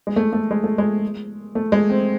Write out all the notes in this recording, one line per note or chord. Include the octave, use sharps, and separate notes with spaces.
G#3
A3
A3
G#3
A3
G#3
A3
G#3
C4